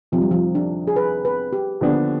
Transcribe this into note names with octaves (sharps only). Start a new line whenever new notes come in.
F2 C3 D#3 F3
G3
F3
D4
G#4
B4
B4
G4
D#2 D3 F3 B3 D4